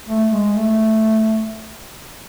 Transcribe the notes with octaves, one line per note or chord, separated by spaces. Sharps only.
A3
G#3
A3